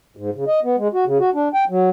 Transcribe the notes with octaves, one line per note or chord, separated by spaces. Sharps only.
G#2
C#3
D#5
B3
G#3
F#4
C#3
F#4
D4
G5
F#3